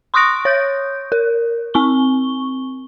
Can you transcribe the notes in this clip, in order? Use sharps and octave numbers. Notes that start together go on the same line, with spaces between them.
C6 C#6 D#6 F#6 A#6 D7
C#5 G6
A#4
C4 C#6 G7